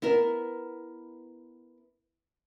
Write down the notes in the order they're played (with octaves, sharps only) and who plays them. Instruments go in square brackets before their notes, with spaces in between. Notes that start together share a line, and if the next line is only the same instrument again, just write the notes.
[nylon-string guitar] B3 E4 A#4